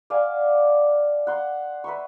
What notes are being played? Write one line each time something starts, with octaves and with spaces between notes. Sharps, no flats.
D5 F5 F#5 G#5
F#5 C6
B4 E5 C6 C#6